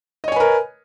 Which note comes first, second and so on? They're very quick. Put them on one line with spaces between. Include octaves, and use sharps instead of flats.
D#5 C#5 G#5 B4 A#4